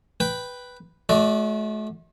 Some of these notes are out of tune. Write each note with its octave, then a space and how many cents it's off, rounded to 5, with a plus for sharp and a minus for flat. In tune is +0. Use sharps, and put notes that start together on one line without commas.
B4 +0 G5 +0
A3 -40 F#4 -15 D5 +0